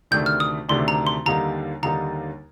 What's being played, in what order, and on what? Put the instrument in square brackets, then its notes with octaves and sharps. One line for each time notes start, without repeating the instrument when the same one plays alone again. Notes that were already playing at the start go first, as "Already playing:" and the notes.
[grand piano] D2 C3 D#3 A3 D4 [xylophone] G6
[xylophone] F6
D#6
[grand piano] D2 C3 D#3 A3 D4 [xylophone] C6
[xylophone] A#5
C6
[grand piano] D#2 D3 G3 A#3 D#4 [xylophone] A#5
[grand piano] D#2 D3 G3 A#3 D#4 [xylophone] A#5